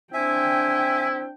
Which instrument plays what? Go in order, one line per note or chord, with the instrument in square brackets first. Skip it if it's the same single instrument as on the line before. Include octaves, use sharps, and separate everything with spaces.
[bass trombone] C4 [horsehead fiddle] D4 G5 [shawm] E4 [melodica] E5 G#5